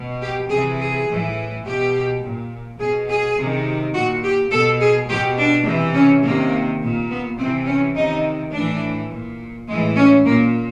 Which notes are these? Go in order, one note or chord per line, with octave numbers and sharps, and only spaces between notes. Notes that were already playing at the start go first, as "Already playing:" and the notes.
Already playing: B2
G4
C3 E3 G#4
G#4
A2 E3
B2 G4
A#2
B2 G#4
G#4
C3 D#3
A#2 F#4
G4
B2 A4
G#4
B2 G4
D4
C3 E3
C#4
C3 D#3 A#3
A#2
B3
C3 E3 C4
C#4
C3 D#3 D#4
A2 E3 D4
A#2
A2 E3 G#3
C#4
A#2 A#3